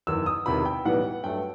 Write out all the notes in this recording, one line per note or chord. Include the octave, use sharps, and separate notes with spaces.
F#1 E2 D#3 E6
D#6
E1 E2 C3 D#3 B5
G5
B1 A2 E3 G3 B3 F#5
G2 F#3 A3 G5